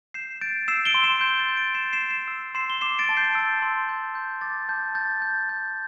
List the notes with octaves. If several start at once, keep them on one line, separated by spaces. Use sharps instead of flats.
G6 C7 E7
G6 A6 D7
E6 C7 E7
D7 G7
C6
C7 E7
G6
A6
G6
A6 D7
G6 C7 E7
C7 E7
G6
C7 E7
E6
C6 C7 E7
G7
D6 C7 E7
A6 D7
A5
G6 C7
E6
C6
G6
G6
D6 A6
A5 G6
G6 A6
G6
G6